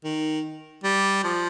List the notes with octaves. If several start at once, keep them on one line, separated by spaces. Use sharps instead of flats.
D#3
G3
F3